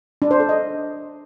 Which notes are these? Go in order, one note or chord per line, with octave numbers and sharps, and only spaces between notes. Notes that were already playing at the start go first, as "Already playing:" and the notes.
D4
C5
A4
D#5